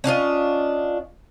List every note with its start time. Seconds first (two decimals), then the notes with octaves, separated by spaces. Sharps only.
0.04 C#4 D4 F4 D#5